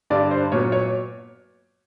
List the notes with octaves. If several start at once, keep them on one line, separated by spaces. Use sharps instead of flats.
G2 D3 G3 D5
C5
A#2 F#3 B3 C#5
C#5